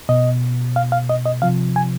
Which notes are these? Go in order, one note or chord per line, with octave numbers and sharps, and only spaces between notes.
B2 D#5
F5
F5
D#5
D#5
C3 F3 F5
G#5